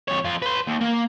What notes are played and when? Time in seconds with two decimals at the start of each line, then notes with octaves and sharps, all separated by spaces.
0.08 F2 C#5
0.25 F2 F4
0.42 B4 C6
0.67 D#2
0.81 A#3